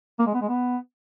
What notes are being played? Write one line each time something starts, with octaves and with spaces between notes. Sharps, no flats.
A#3
G#3
B3
G#3
B3